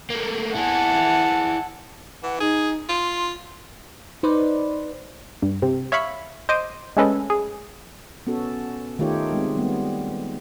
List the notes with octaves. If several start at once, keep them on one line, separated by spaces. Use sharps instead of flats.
A3 A#3
E4 G#4 F#5 A5
E3 F#5
D#4 G#4
F4 C6
D#4 B4 C5 D5
G2
C3
C#5 E5 F5 B5 C#6
C5 D#5 D6 D#7
G#3 A3 C#4 A4 B4 D#5
G#4
B3 C#4 F#4 A4
D#3 A3 D#4 F4 G4 C#5
G#3 C4
G3 B3